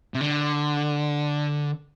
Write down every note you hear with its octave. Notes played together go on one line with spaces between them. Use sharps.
C3
D3